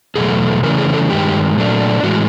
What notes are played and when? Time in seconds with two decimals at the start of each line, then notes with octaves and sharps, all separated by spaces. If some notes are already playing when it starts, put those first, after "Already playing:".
0.16 E2 B2 F#3 A3 G#4
0.63 C#3 E3 A3 C#4 A#4
0.78 G#4
0.94 A4
1.10 G2 D#3 G#3 G4
1.57 A#2 F#3 A3 D4
2.03 A2 E3 G#3 F#4